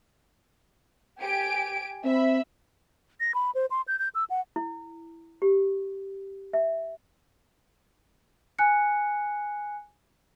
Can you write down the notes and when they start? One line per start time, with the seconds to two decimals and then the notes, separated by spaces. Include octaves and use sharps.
1.21 G4 G#5 D7
2.05 C4 E5 B5
3.20 A#6
3.34 B5
3.55 C5
3.70 C6
3.88 G6
3.99 G6
4.15 E6
4.30 F#5
4.56 E4
5.42 G4
6.53 E5
8.59 G#5 F#6 C#7